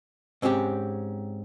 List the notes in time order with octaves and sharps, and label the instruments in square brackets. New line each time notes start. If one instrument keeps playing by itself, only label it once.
[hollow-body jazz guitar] G#2 C4 C#4 F#4 G4